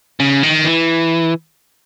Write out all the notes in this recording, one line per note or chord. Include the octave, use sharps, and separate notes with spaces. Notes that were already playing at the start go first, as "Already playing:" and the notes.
C#3
D#3
E3